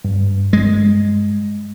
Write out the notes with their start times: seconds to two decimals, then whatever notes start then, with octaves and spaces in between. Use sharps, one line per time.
0.05 G2
0.53 G#3